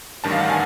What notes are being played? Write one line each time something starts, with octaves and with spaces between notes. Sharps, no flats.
A1 G2 D#3 A5
F5
F#5
G#5